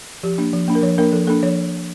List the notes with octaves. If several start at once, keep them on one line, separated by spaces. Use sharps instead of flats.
F3 G4
A#3 D4
F3
A#3 D4
A#4
F3 C#5
A#3 D4 A#4
F3 A4
A#3 D4 A4
F3 C#5